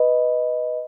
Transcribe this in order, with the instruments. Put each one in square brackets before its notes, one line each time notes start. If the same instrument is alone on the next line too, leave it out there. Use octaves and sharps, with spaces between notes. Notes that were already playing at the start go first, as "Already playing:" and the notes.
Already playing: [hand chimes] B4 D#5